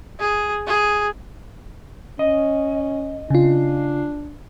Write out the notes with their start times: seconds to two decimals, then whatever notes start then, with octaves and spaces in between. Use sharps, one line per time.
0.20 G#4
0.67 G#4
2.19 C#4 D#5
3.30 C#3 D4 F4